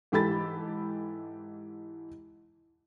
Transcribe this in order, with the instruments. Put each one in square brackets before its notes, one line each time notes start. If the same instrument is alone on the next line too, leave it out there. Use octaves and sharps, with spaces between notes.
[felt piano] G#2 E3 G4 A4 B5 A6